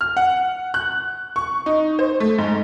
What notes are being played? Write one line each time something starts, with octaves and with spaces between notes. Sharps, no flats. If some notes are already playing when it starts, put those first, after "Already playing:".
F6
F#5
F#6
C#6
D#4
C5
A3
G#2